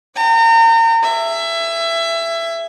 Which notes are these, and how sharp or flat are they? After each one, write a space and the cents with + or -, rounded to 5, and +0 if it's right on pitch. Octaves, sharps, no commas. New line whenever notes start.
G5 -20 A#5 -35
G#4 -10 E5 +20